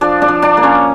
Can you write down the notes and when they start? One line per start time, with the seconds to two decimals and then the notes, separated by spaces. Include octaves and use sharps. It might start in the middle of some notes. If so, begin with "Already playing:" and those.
0.01 F3 D4 D5
0.22 D4 D5
0.28 F3
0.42 D4 D5
0.57 A#3
0.63 C#4 C#5